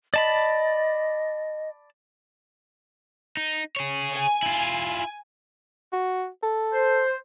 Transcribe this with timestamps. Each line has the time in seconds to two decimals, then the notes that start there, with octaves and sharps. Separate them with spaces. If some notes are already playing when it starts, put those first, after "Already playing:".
0.14 D5 D#5 A5 B5
3.37 D#4
3.76 G#4 C#5
4.12 G#5
4.43 E4 F4
5.93 F#4
6.43 A4
6.73 C5